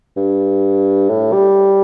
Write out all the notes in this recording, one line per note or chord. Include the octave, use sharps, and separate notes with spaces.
G2
A2
G3